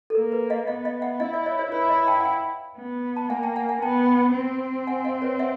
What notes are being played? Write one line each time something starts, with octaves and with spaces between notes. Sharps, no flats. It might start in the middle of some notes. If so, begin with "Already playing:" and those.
A4
A#3 A#4
B4
D#5 F5
B3 D#5 F5
D#5 F5
E5 F#5
E4 D#5 F5
D5 E5
C#5 D#5
C5 D5
E4 B4 C#5
C#5 D#5
G5 A5
F#5
F5 G5
B3
A5
A#3 F#5 G#5
G5 A5
F#5 G#5
F#5 G#5
B3 G5 A5
C4
F#5 G#5
D#5 F5
B4 C#5
E5 F#5